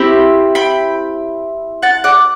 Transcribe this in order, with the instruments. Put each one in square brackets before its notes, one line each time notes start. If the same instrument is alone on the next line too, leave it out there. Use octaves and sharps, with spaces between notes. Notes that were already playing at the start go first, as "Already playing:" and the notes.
Already playing: [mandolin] C4 E4 G4
G5 B5
F#5 A5
D5 F#5